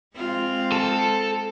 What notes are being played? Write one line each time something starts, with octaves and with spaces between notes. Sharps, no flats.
G#3 C4 F4
A4